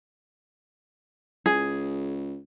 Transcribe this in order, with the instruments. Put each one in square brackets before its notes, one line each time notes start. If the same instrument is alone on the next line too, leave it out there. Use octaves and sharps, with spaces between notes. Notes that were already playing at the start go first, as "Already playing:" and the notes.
[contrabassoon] C#2 [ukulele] G#4